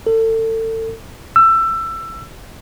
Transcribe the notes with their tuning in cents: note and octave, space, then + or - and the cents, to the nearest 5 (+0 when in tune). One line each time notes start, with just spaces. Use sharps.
A4 +30
E6 +20